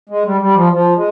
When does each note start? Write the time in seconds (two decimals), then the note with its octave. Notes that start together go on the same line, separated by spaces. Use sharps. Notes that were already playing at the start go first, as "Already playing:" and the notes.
0.09 G#3
0.26 G3
0.41 G3
0.56 F3
0.73 F3
0.96 G#3